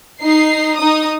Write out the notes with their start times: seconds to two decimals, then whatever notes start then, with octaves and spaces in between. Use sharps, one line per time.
0.21 D#4 C7
0.77 D#4 D#6